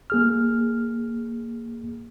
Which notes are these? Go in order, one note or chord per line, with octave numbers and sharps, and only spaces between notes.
A#3 G#4 F6